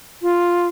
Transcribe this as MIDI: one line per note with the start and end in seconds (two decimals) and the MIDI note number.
0.22 0.67 65